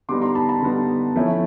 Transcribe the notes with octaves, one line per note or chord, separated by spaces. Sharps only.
D3 G3 B3 D#4 C6 D6
A#5 C6
A5 B5
A5 B5
D3 G3 B3 D#4
F3 A3 C#4 E4